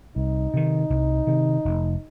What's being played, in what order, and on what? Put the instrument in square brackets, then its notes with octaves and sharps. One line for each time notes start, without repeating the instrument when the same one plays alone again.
[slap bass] C2 [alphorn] D#4
[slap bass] C3 D#3
C2
C3 D#3
F1